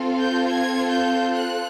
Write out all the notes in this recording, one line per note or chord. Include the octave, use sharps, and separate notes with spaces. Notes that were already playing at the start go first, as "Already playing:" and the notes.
Already playing: C4 F4 A4
G6
G#6
G6
F#6